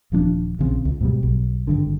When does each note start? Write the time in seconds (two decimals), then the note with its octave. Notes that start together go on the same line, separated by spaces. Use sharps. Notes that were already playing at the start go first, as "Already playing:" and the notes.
0.12 D#1 F3 C#4 D4
0.59 A#1 C#3 C4
0.85 C#2
1.01 G#2 B2 G3
1.23 B1
1.67 G#1 G2 D3